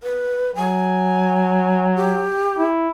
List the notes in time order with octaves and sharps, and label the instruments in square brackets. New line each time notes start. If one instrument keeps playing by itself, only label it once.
[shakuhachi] B4
[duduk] F#3 [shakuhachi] G#5
[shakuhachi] G4
[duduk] E4